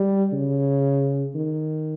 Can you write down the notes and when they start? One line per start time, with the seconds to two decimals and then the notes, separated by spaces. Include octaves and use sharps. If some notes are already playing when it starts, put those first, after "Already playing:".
Already playing: G3
0.33 C#3
1.35 D#3